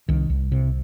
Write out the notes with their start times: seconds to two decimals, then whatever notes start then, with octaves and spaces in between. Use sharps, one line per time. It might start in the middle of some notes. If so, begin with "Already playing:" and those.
0.09 C2 D#3
0.30 C2
0.52 C3